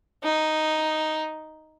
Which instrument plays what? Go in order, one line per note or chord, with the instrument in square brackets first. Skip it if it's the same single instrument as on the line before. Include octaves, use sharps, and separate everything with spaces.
[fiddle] D#4